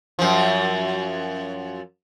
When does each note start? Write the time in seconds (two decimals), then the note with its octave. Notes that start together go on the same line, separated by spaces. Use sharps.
0.19 F#2 F3